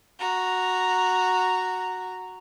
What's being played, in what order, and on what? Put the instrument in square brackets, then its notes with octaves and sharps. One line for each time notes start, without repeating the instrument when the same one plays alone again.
[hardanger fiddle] F#4 A#5